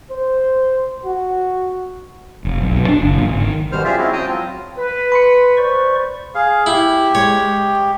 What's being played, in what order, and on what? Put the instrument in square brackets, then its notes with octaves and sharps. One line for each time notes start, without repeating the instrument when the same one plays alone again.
[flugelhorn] C5
F#4
[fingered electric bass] F1
B1
B2
D4
F#1
A#2
G#1
D#3
[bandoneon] F#2 B2 G3 C5 F6
F4 G4 G#4 C5 D5 E5
F3 G#3 C4 C#4 E4 F#4
C5 G5 A5 A#5 D#6
F#3 C4 F4
[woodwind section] B4
[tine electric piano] B5 C6 C#7
[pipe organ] C5 D5 C#6
[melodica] G#4 F5
[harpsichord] E4 [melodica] G4
[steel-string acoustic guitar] G#3 [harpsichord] C#5